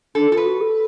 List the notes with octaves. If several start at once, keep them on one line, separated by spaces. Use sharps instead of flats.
D4 A4
F4 A4
B4
F#4
A4